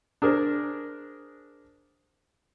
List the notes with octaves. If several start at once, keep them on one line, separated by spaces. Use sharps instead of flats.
D4 G#4 A#4 C5